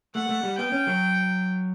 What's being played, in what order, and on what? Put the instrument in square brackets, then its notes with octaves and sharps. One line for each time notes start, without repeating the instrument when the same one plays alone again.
[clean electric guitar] A3 [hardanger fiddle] F#5
[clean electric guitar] A3
G3
[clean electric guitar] B3 [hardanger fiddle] G5
[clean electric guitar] C#4
F#3